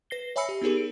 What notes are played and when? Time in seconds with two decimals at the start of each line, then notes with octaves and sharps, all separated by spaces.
0.10 B4 A#6 C7 G7
0.36 C#5 E5 G#5 B5 E6 C#7
0.49 G4
0.62 B3 D#4 G4 G#4 A#4
0.77 D7